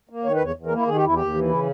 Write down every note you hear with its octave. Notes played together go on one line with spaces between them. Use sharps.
A#3
D#3 C#5
B4
E2
C#5
E2
A#4
A#3
E4
D#3 G#4
G4
E2 E4
D#2 G4
E3
C#3 E4